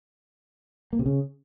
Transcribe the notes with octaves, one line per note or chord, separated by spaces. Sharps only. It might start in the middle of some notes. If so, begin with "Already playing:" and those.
A#3
C3
C#3